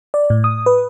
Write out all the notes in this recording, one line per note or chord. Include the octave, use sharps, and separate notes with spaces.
D5
A2
D#6
B4